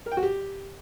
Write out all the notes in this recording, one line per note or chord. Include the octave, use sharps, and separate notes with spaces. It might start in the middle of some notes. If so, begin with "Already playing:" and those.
A#4
G5
F#4
G4